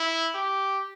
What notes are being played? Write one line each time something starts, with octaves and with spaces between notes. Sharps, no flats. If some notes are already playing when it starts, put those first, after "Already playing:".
Already playing: E4
G4